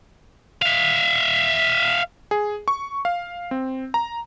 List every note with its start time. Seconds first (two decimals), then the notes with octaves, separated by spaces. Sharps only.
0.62 E5 F5
2.31 G#4
2.68 C#6
3.05 F5
3.51 C4
3.94 A#5